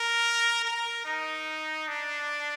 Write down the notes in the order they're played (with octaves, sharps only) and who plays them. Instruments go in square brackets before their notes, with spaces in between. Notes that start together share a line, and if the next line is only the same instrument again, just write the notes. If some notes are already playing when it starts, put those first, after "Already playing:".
Already playing: [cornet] A#4
A#4
D#4
D4